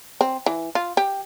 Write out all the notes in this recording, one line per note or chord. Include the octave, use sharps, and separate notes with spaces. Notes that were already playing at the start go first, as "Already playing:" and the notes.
C4
E3
F4
G4